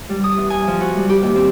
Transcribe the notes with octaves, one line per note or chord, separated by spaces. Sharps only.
G3
D#6
E2
G#5
F3
F#4
G3
G4
D#2
C4